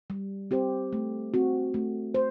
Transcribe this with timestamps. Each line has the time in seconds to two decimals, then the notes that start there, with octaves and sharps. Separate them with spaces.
0.10 G3
0.51 C4 G4 C5
0.93 A3
1.34 C4 F#4
1.74 A3
2.14 C5